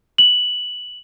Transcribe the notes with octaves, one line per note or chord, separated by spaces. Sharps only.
F#7